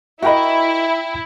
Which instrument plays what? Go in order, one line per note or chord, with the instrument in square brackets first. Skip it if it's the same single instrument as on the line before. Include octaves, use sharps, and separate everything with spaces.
[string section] E4 [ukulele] F#4 A#4 D#5 [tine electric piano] E5 G5 B5